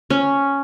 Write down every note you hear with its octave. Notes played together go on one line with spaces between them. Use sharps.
C#4